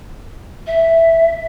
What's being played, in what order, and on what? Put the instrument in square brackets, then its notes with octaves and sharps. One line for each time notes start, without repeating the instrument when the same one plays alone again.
[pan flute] E5